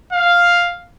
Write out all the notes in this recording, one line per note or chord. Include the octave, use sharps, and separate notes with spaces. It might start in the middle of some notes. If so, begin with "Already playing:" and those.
F5